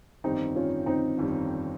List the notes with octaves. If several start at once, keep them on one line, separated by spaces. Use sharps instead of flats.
G1 F2 D#3 G3 C4 D#4
C#4 F4
C4 D#4
G1 F2 D#3 G3